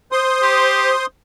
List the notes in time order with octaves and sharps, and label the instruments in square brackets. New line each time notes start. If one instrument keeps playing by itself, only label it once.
[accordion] C5 C6 D#6
[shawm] G4